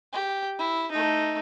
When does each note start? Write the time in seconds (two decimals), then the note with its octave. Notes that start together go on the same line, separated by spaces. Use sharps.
0.13 G4
0.59 E4
0.91 A3 D#4